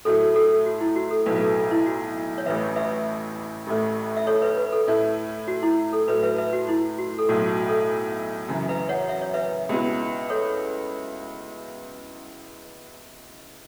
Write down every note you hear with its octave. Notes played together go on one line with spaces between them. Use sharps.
A2 F#3 A3 E4 A4
A4
F#4
E4
F#4
A4
B1 A2 F#3 B4
A4
E4
F#4
C#5
A1 A2 E3 B4 E5
B4 E5
A1 A2 A3
E5
A4 C#5
B4 E5
B4
A4
A2 A3 E4
F#4
E4
A4
A2 F#3 A3 B4
B4 E5
B4 E5
F#4
E4
F#4
A4
B1 A2 F#3 F#4
F#4
A4
F#2 C#3 E3
B4 E5
C#5 F#5
E5
C#5
B4 E5
C#2 B2 B3 E4
A4 C#5